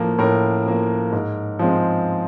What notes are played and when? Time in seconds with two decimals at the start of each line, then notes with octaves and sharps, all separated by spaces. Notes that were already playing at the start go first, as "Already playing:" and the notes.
Already playing: A2 F3 A#3
0.18 A2 A#4
0.66 F3 A#3
1.12 G#2
1.59 F3 G#3 C4